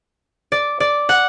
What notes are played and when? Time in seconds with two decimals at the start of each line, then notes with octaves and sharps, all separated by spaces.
0.52 D5
0.80 D5
1.09 F#5